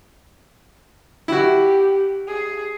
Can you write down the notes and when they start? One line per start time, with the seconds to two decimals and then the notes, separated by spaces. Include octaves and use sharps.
1.28 E4 F#4 G4
2.28 G#4